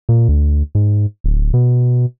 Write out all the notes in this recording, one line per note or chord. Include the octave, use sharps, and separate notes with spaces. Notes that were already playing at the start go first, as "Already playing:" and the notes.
A#2
D2
G#2
D1
B2